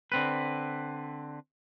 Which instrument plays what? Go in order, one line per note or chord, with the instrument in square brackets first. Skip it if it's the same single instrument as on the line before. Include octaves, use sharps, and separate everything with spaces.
[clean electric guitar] D3 C4 B4